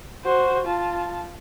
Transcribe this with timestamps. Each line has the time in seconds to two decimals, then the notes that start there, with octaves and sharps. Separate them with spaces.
0.24 F#4 C5
0.66 F4 A5